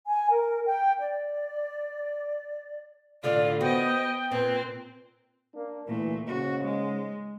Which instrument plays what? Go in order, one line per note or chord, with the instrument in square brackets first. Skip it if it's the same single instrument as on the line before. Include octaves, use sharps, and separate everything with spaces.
[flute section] G#5
A#4
G5
D5
[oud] A2 D3 D4 [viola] F4 [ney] D5
[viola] B3 D#5 [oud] F#4 [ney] C5 [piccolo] G5
[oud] A#2 [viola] C4 [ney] B4
[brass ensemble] A#3 D4
[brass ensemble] D2 E3 [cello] A#2 A3
[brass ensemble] G#2 C#3 [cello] F#4
[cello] G#3